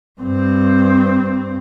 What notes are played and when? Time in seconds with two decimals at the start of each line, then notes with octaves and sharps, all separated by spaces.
0.20 G2 C4